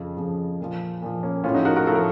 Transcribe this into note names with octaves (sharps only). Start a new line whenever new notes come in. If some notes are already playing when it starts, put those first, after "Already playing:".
Already playing: F2 C#3 F3
F2 C#3 F3
A#2 F3
A#2 F3
A#3 C#4
A2 F3 C#4 F4
D#4 F#4
F#4 A#4
F#4 A#4
A2 F3 A4
A#4